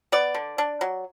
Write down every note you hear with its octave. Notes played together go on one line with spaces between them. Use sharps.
B3 D5
D3
D4
F#3